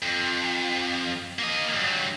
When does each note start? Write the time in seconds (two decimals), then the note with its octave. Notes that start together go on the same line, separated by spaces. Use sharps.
0.02 F2
1.39 A#3 D#5
1.75 G2 F#3